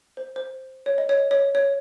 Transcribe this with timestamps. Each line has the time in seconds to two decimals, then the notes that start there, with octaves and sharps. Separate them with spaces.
0.17 C5
0.36 C5
0.86 C#5
0.98 D#5
1.09 C#5
1.31 C#5
1.55 C#5